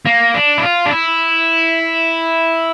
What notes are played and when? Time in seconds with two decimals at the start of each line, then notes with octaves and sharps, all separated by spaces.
0.06 A#3
0.34 D4
0.58 E4
0.63 F4
0.86 D4
0.91 E4